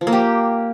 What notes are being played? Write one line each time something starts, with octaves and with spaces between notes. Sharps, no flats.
F3
A#3
G4